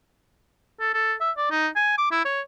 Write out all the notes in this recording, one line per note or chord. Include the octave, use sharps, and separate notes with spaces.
A4
A4
E5
D5
D#4
G#5
D6
E4
C#5